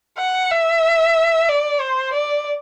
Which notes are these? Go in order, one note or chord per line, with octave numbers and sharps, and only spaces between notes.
F#5
E5
D5
C5
D5